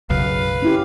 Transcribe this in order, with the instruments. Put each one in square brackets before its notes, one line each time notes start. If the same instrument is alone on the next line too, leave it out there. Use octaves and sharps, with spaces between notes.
[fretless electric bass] B1 F#2 [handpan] C#3 [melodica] B4 F5
[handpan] C#4 E4 G4